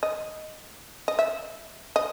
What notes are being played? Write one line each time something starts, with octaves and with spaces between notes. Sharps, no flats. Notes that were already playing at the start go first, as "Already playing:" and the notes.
D#5
D#5
E5
D#5